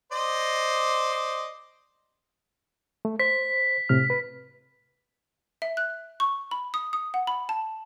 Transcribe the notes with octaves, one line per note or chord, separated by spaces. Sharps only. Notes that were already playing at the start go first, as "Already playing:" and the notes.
C5 D5 D#5
A3
C5 B6
A2 C3 F6
B4
E5
F#6
C#6
B5
D#6
D#6
F#5
B5
A5